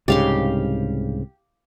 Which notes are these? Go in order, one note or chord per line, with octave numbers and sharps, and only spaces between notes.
C2 G#2 C#3 G4 F5 C6